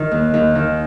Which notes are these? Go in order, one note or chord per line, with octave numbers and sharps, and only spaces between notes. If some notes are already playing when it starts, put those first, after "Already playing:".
Already playing: D#3
D#2
D#2
D#3